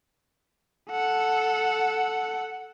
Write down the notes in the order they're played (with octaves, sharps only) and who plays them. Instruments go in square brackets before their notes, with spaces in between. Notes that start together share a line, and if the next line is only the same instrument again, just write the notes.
[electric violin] A4 F#5